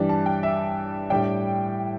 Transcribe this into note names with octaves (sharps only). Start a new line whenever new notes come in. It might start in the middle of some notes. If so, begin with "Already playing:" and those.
Already playing: G2 E3 G3 D4
A5
G5
E5
A2 G3 D4 G5